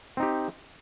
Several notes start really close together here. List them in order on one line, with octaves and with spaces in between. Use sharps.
C4 D#4 G4